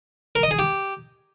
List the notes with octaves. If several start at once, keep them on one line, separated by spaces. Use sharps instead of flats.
A#4
D#5
G#4
G4